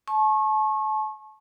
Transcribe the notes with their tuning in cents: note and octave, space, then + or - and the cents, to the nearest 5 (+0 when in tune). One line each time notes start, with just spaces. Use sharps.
A5 -35 C#6 -30